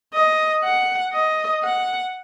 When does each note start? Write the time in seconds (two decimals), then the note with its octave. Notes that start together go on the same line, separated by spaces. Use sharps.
0.13 D#5
0.64 F#5
1.14 D#5
1.63 F#5